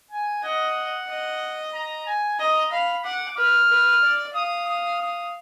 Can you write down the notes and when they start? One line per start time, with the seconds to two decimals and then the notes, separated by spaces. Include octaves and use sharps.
0.11 G#5
0.43 D#5 F#5
1.08 D#5
1.74 A#5
2.06 G#5
2.39 D#5 A#5
2.71 F5 B5
3.04 F#5 D6
3.37 B4 F6
3.70 B4
4.03 D5
4.34 F5 D#6
4.68 D#6
5.00 D#6